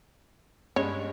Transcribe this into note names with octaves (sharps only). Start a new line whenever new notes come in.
G2 G#3 C#4 C#5